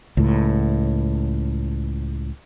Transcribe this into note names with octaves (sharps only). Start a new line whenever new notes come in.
C#2 A2